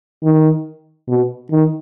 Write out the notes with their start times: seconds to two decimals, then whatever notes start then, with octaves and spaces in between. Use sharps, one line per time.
0.23 D#3
1.08 B2
1.51 D#3